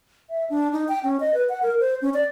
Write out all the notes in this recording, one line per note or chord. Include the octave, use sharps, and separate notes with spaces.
E5
D4
D#4
G5
C#4
D#5
B4
F#5
A#4
C5
C#4
D5